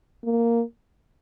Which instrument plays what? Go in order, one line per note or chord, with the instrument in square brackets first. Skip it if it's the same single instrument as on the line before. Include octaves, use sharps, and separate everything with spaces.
[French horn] A#3